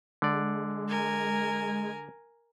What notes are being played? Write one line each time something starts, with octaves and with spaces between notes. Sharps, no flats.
D3 G#3 D5
A#4 G#5